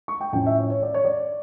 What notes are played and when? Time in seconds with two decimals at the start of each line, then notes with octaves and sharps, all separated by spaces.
0.08 C#6
0.21 G5
0.33 A2 F3 C#4 G5
0.46 E5
0.59 C#5
0.70 C#5
0.83 D5
0.94 C#5
1.05 D5